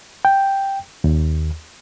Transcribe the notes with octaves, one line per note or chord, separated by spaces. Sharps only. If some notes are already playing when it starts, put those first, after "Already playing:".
G5
D#2